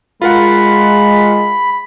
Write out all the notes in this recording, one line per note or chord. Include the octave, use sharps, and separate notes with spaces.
G#3 F4 A#4 F#5 B5